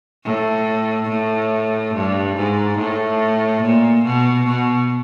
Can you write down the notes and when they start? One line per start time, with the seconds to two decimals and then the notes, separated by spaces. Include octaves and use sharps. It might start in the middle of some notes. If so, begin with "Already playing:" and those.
0.25 A2
1.09 A2
1.95 G2
2.37 G#2
2.78 A2
3.63 A#2
4.05 B2
4.47 B2